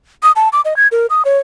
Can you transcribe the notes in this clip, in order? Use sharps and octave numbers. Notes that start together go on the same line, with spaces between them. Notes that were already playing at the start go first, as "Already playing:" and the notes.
D#6
A5
D6
D#5
G#6
A#4
D#6
C#5